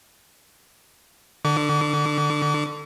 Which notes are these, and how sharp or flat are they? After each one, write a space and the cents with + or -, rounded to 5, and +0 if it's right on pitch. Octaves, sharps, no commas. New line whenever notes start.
D3 +20 D6 -45